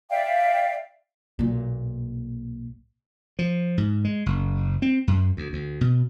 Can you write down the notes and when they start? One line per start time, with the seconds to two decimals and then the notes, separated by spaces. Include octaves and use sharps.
0.10 D5 E5 F5 G5
1.39 B1 A#2
3.39 F3
3.78 G#2
4.05 G#3
4.26 F#1
4.82 C4
5.07 F#2
5.37 D2
5.53 D2
5.81 B2